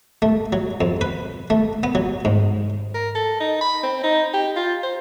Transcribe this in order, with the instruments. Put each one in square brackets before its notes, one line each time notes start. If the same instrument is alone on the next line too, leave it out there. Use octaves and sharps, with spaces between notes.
[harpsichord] A3
F#3
F2
B4
A3
B3
F#3
G#2
[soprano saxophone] A#4
A4
D#4
B5
C4
D#4
G4
F4
C5